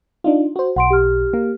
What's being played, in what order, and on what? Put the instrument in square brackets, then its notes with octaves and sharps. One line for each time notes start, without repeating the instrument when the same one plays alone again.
[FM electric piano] D4 D#4 F4
F#4 C5
[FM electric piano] B1 [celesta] F#5 C6 D7
[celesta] G4 F6
[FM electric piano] A#3